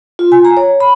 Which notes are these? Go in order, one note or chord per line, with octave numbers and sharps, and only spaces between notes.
F4
G#5
A#5
C#5
B5